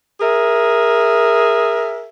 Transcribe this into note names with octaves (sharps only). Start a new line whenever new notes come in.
G#4 A#4 E5